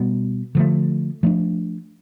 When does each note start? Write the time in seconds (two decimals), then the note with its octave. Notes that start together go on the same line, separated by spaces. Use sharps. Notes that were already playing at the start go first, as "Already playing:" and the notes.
Already playing: B2 G3 B3
0.55 D3 F3 A3
1.23 F3 A3 D4